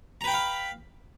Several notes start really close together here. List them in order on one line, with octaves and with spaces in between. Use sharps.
A#5 B4 G5 B5 F5